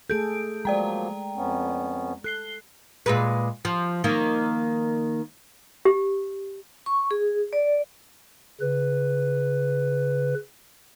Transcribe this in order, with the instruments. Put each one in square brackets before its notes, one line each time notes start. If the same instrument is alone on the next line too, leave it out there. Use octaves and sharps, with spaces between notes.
[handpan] A3 G#4 A4 [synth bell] G6 D7
[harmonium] F3 F#3 A#3 [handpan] G#3 [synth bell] D5 G5 A#5
[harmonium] F2 B3 C#4
[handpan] A4 [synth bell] F#6 C7 G7
[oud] A#2 G#3 B4
F3
D#3 A#3
[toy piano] G4
[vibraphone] C#6
G#4
D5
[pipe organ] C#3 B4